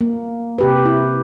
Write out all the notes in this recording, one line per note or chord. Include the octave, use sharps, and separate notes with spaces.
A#3
C3 G4 B4
E4